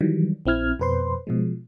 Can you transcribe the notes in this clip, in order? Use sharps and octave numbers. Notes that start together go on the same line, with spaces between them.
D#3 E3 F#3 G3
A#1 C4 E4 F6 G#6
F2 B2 B4 C5 C6
B2 F3 G#3